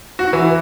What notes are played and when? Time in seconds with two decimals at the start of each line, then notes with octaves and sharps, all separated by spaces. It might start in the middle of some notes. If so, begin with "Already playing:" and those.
0.19 F#4
0.33 E3